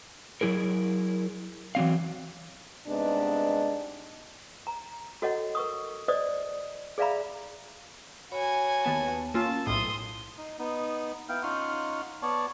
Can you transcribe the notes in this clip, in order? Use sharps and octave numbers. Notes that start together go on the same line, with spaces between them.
F#3 E4 G#4 A#4
E3 F#3 C4 F5
G2 C3 G#3 B3 D4 D#4
A#5
F#4 A4 C#5 D#5 F#5
A#4 C#6 D#6
C5 D5 D#5 D#6
G#4 D5 E5 F5 A#5 B5
F#4 C#5 G#5 B5
D#2 B3 A5
A#3 C#4 F4 A5 E6
B1 A2 C6 D#6
D#4
B3 D#4
B3 E4 F5 G5
C#4 D#4 F4 F#5 C6 F6
B3 C#5 D5 A5